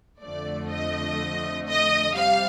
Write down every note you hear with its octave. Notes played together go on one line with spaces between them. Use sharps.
F2 D3 F3 A3 D5
D#5
D#5
C3 G3 F5